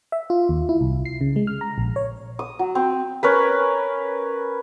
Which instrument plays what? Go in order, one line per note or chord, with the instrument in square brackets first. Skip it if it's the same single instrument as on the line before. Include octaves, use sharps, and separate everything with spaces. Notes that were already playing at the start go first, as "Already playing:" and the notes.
[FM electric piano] E5
F4
D#2
E4
C2
C7
C#3
G#3
F6
A#5
A#1
C#5
[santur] D#6
F#3
C4
C#4 A#4 B4